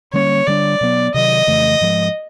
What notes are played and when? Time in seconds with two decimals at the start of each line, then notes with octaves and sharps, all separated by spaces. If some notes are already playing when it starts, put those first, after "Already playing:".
0.13 D3 G3 A#3 C#4 C#5
0.47 D3 G3 B3 D4 D5
0.81 B2 F#3 B3
1.14 C3 D#3 F#3 D#5
1.47 F2 C#3 E3 A3
1.81 G#2 F3 G#3